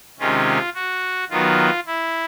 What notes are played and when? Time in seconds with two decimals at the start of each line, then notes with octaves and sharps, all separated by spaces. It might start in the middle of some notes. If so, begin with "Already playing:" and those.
0.19 C3 D#3 G#3 C#4 F4
0.75 F#4
1.30 D#3 F#3 B3 F4
1.86 E4